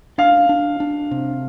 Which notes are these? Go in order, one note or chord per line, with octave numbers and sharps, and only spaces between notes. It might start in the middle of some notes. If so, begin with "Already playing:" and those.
D4 F5
D4
D4
C3